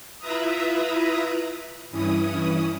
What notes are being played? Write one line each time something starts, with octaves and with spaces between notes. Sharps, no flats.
E4 F4 B4 E5 A#5 D#6
G2 E3 C#4 E4 D#6